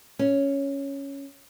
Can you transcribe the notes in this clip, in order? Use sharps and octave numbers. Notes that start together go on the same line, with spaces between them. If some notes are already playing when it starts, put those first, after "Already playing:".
C#4